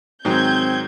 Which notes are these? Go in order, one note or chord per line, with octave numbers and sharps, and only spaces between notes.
G#2 D#3 F#3 C4 G6 G#6